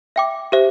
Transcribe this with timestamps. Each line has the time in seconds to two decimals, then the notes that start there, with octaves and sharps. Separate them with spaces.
0.16 E5 G5 D6
0.52 G4 C5 E5